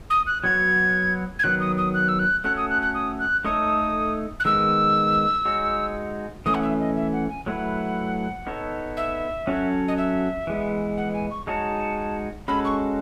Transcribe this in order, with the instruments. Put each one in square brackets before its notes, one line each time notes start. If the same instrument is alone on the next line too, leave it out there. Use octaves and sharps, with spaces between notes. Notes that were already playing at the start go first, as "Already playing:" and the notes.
[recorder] D#6
F#6
[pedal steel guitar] F#3 B3 F#4 C#5 [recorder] G#6
[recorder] G#6
[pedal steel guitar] D#3 F#3 B3 [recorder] F#6
[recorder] D#6
D#6
F#6
E6
F#6
[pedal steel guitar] A3 C#4 F#4 A4 C#5 [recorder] F#6
[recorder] D#6
F#6
F#6
D#6
F#6
[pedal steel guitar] A3 D#4 A4 C#5 [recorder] D#6
[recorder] F#6
[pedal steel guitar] D#3 G#3 B3 [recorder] E6
[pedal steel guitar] G#3 D#4 F#4 C#5
[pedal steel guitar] E3 A3 C#4 [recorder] D#6
[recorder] F#5
E5
D#5
E5
F#5
G#5
[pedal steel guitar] F#3 A3 E4 B4 [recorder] F#5
[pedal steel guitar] B3 D#4 A4 C#5
[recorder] E5
[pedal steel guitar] F#3 C#4 F#4 A4 C#5
[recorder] D#5
E5
[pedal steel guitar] E3 G#3 B3
[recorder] F#5
G#5
C#6
[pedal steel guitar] G#3 D#4 F#4 C#5 [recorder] A5
[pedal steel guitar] G#3 C#4 F#4 A4 [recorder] B5
[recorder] C#6